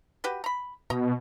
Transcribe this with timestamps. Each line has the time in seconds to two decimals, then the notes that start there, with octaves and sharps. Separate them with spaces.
0.24 F#4 G4 B4
0.44 A#5 B5
0.90 B2 D#5 A#5